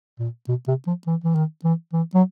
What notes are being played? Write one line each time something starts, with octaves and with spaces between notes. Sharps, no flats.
A#2
B2
C3
F3
E3
E3
D#3
E3
E3
F#3